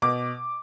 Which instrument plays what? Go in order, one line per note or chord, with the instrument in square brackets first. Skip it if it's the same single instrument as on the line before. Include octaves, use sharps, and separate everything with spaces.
[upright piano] B2 D6